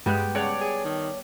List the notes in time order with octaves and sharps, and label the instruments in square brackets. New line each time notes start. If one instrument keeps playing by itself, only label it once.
[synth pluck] G2 G#3 [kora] G3 B3 G4
[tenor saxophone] C#3 [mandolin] C#5 D5 A5 [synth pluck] F#5
[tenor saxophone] G#4
D#3